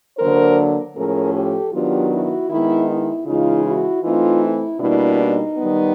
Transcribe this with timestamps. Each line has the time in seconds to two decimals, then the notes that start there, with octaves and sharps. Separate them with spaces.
0.18 D3 F#3 A#3 D4 A#4 C5
0.96 A2 F3 A3 C#4 G#4 A#4
1.34 G4 A4
1.73 D#3 F#3 B3 D4 F4 G4
2.11 E4 F#4
2.49 D#3 G#3 B3 E4
2.89 E4
3.26 C#3 E3 G#3 D#4 F4
3.65 E4 F#4
4.04 E3 A3 C4 D#4 F4
4.43 E4
4.80 B2 G3 A#3 D4 E4
5.19 D#4
5.58 D#3 G3 B3